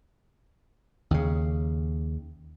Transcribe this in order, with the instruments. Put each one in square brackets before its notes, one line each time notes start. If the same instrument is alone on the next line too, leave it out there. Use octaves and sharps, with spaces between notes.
[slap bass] D#2 C#3